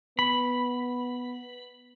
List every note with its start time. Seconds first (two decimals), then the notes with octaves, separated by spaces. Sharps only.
0.19 B3 B5